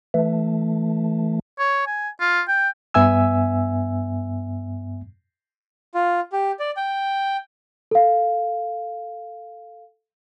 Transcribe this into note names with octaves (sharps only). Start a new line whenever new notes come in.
E3 A3
C#5
G#5
F4
G5
G2 B3 E5 G#5 E6
F4
G4
D5
G5
A4 F5